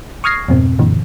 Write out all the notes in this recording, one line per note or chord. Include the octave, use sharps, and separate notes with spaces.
C#6 D#6 F6 G#6 A#6 C7
F2 G#2 B2 C4
F#2 A#2 D3 E3